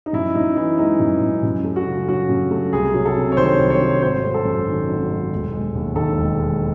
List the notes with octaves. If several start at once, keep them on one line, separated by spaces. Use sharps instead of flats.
D#4
F#2 E4
F#2 D#4
E3 E4
G#3 D#4
F#2
F#2
F#2
A3
F#4
C#3
F#3 F#4
F#2
A3
C2 G#4
F#3
A4
C3
C#5
D#3 C5
C2
C#5
F#3
G#1 C5
A3
A4
F#2
D#3
G#1
A3
E1
G#3
D#2
D#3 A4
E1
G#3